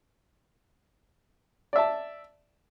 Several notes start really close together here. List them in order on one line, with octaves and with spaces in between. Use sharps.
D5 E5 A5